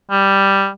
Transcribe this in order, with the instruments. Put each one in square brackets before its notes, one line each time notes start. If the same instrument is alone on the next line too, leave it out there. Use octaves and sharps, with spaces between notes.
[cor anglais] G3